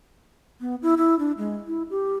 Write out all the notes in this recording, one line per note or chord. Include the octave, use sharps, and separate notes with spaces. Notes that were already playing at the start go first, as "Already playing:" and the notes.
B3
E4
E4
D4
G#3
E4
G4